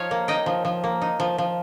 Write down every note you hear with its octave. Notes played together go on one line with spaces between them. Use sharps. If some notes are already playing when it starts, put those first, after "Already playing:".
Already playing: F3 D#4 C#5 F5
A#3
D#4 D#5 G5
F3
F3
A#3
D#4
F3
F3